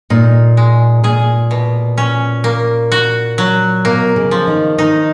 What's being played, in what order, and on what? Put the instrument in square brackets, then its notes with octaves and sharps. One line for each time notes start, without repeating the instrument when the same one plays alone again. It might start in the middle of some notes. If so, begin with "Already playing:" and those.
[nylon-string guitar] A#2 [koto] D#4
[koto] G#3
[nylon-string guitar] A#2 [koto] G#4
[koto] B2
C#4
A#3
F#4
F#3
[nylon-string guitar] B2 [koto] A#3
[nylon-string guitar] C#3
[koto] F3
[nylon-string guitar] D#3
[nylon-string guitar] D#3 [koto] D#4